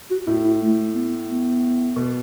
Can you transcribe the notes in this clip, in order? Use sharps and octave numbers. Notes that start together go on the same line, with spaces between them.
F#4
A2 E4
E4
A3
B3
B3
B2